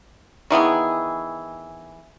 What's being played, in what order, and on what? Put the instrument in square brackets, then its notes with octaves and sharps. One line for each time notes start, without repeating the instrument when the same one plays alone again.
[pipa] D#3 E3 B3 G#4